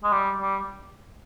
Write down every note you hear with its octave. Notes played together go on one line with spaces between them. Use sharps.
G#3
G3
G3